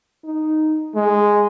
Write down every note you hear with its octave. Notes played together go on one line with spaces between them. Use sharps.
D#4
G#3